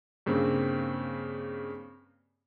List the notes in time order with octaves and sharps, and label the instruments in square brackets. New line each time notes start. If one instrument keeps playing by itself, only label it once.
[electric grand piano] G2 C#3 A#3 C4